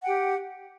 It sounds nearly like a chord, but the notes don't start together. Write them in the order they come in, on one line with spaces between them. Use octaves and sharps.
F#5 G5 G4